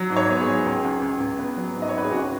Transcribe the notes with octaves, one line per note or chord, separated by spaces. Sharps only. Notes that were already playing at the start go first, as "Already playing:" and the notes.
Already playing: F#3
G#2
C#5
B3
G#4
F#3
C#2
C#2
C#2
C#2
B3
F#3
G#2
D#5
C#5
G#1 B4
G#4
C#2 F#4